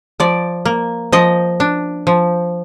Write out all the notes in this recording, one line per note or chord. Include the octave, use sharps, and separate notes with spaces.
F3 D5
A#3
F3 D#5
D4
F3